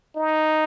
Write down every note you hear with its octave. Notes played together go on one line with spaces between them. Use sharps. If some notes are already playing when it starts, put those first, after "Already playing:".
D#4